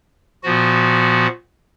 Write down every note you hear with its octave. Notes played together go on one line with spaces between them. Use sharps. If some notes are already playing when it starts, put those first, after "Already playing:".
A#2 F3 B3 F#4